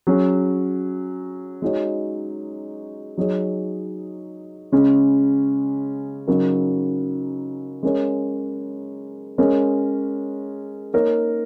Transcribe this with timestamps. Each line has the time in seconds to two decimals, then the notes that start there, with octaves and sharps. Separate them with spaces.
0.07 F#3 C#4 G#4 C#5
1.62 G#3 D#4 F#4 C#5
3.17 F#3 D#4 G#4 C#5
4.72 C#3 G#3 C#4
6.28 C#3 F#3 D#4 A#4
7.83 G#3 C#4 A#4 C#5
9.38 G#3 C#4 A#4 C#5
10.94 A#3 D#4 A#4 C#5